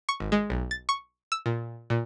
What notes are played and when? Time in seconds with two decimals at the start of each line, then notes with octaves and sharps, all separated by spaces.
0.09 C#6
0.20 G#1
0.32 G#3
0.50 B1
0.71 A6
0.89 C#6
1.32 E6
1.46 A#2
1.90 A#2